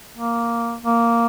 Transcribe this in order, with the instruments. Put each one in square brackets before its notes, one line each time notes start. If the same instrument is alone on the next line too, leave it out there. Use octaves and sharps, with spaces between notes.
[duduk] A#3
A#3